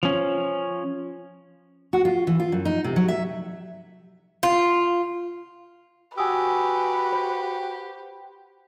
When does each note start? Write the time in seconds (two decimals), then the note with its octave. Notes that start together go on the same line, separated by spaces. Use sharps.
0.03 F3 C#4
1.93 F#4
2.05 F4
2.27 E3
2.40 F4
2.52 F#2
2.65 D#4
2.84 C3
2.96 F#3
3.08 E5
4.43 F4
6.18 F#4 G4 B4 G#5 D#6 E6
7.12 C5